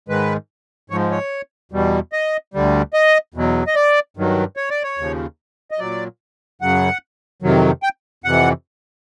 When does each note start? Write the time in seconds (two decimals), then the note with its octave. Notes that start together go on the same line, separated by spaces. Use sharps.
0.08 G#2 D#3 G#3 B4
0.90 G#2 F3 G#3 C#5
1.11 C#5
1.72 E2 B2 G3
2.13 D#5
2.54 D2 D3 G3
2.93 D#5
3.34 E2 B2 F#3
3.67 D#5
3.75 D5
4.17 G2 D#3 F#3
4.57 C#5
4.70 D5
4.83 C#5
4.98 D#2 C#3 F3
5.71 D#5
5.79 A#2 F#3 D5
6.61 F#2 C#3 F#3 F#5
7.42 F2 C3 D#3 F#3
7.83 G5
8.24 F2 C3 E3 F#5